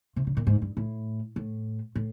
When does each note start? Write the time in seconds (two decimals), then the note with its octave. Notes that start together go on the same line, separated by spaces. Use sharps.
0.16 C3
0.27 C#3
0.37 A#2
0.47 G#2
0.62 G2
0.77 A2
1.36 A2
1.95 A2